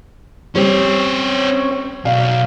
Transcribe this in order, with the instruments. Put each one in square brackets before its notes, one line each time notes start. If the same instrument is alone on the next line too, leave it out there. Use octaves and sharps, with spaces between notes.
[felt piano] G3 [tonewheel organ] C4 C#5 [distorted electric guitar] C#4 C5
[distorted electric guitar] B1 [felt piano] F5